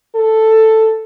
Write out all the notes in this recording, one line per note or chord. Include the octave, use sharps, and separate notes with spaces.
A4